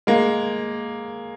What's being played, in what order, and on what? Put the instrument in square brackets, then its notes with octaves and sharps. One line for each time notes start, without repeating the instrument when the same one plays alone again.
[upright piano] G#3 A#3